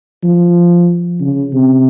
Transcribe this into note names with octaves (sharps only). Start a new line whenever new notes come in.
F3
C#3
C3